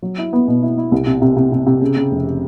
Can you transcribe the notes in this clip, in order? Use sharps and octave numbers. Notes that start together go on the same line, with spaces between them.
F#3
E4
B3
B2
E4
E4
C2
C3
C3
C3
C3
C3
C#3
C#3
F1